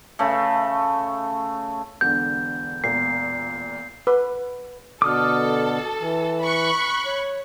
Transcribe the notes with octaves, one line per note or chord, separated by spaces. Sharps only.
C#3 A3
E1 D3 G6
E1 A#2 C7
B4
B2 D3 A4 D6 D#6 F6
E3
B5 C#6 F#6
C#5